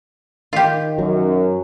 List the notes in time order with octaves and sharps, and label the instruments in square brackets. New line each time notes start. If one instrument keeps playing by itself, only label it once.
[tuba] D#3 [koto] F4 G4
[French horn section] F#2 [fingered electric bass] F#3